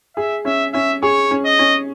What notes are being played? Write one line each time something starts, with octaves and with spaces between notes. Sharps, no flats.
G#4 E5
C#4 E5
C#4 E5
G#4 C#5
C#4
D#5
C#4